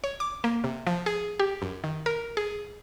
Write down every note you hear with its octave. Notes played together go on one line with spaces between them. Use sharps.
C#5
D6
A#3
C3
F3
G#4
G4
F#2
D#3
A#4
G#4